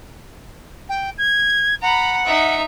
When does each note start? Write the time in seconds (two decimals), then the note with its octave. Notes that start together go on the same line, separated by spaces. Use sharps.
0.89 G5
1.18 G#6
1.82 F#5 A#5 B5
2.26 D#4 E5